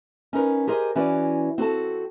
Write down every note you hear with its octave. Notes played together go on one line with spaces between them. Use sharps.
C#4 D#4 A#4 B4
G4 G#4 A#4 C5 D#5
E3 C#4 F#4 B4 D5
C4 F#4 A4 A5